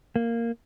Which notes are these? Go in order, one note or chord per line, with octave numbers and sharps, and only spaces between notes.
A#3